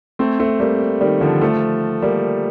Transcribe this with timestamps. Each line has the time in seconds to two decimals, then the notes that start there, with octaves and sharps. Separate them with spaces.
0.19 A3 C4
0.39 A3 C4
0.60 G3 A#3
1.01 D#3 G3
1.21 D3 F3
1.41 F3 A3
2.02 G3 A#3